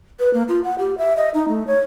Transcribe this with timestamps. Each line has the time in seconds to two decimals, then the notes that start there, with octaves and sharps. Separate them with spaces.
0.20 B4
0.34 A#3
0.49 F4
0.64 F#5
0.79 G4
0.98 E5
1.17 D#5
1.34 D#4
1.48 A3
1.67 C#5